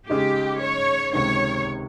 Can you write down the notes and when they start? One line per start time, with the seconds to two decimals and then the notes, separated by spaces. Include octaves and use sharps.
0.10 C#3 G#3 D#4 G4
0.61 C#5
1.13 C#2 C3 D#3 C#5